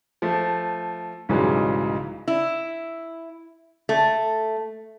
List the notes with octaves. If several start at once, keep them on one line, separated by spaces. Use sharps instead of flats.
F3 A3
B1 G#2 C#3 E3 F#3 G3
E4
A3